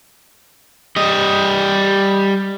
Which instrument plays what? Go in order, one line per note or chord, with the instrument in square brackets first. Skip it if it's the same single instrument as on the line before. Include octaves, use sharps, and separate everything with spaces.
[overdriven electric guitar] G3 D#5